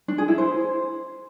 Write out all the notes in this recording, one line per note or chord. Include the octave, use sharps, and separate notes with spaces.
D4
G#4
E4
C5